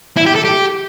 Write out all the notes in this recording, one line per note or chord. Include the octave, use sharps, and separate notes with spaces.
E4
G4
A4
G4